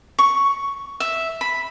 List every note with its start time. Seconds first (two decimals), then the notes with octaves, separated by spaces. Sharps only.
0.19 C#6
1.00 E5
1.41 B5